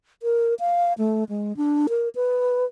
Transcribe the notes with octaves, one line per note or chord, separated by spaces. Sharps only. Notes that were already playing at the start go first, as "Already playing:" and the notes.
A#4
F5
A3
G#3
D4
A#4
B4